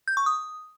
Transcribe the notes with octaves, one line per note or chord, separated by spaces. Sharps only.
G6
C#6
D#6